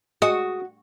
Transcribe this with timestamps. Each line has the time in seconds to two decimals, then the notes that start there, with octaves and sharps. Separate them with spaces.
0.22 G#3 F#4 D#6